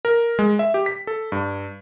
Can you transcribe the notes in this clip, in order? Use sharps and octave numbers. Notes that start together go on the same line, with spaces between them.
A#4
G#3
E5
G4
B6
A4
G2